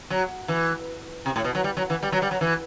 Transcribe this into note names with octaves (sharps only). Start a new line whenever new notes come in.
F#3
E3
C3
A2
B2
F#3
G3
F#3
E3
G3
F#3
G3
F#3
E3